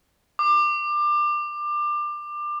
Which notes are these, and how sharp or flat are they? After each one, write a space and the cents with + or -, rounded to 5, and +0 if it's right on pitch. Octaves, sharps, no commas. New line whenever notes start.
D6 +25